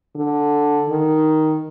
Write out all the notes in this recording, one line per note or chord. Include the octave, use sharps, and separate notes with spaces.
D3
D#3